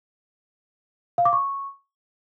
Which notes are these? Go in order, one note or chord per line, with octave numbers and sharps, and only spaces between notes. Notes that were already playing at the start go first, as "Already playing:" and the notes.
F5
D6
C#6